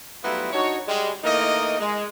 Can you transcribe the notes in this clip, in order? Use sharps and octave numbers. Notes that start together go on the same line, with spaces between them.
F#3 G3 A3 B3 E4 F4
D4 D#4 F#4 C#5
G3 G#3
E3 A3 A#3 D#4 A#4 D#5
G#3